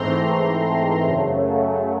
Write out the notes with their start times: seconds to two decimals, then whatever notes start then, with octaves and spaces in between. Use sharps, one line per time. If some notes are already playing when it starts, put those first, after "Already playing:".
Already playing: G#2 E3 A3 C4 A#5 C6
1.05 F#2 C#3 F#3 A3